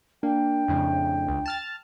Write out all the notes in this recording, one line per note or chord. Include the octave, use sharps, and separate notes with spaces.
A#3 D4 G5
F2 A2 C#3
C#2
A5 F6 A6